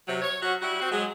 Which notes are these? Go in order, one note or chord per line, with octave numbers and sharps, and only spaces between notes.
C3 F#3
C#5
F#3 C#4 F#4
G3 E4 F#4
C4 F#4
F#3 G#3